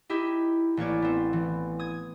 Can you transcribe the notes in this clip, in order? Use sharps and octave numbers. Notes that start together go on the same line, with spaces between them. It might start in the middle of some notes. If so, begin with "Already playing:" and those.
D#4 E4 G4
A1 A#3 C#5 D5
B3 C4
E3
D#6 G#6